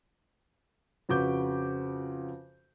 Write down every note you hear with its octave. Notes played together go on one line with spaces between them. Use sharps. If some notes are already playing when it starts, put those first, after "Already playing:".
F2 C#3 F#4 B4 D6 G6